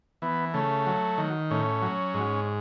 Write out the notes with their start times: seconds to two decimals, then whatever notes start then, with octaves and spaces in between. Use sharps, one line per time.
0.22 E3 B3
0.54 C#3 A3
0.86 F#3
1.18 D#3
1.51 A2 C#4
1.82 F#3
2.14 G#2